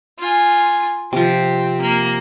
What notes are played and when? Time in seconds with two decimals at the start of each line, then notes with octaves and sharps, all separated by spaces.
0.19 F4 G#5
1.13 C3 F3 C4
1.81 A#3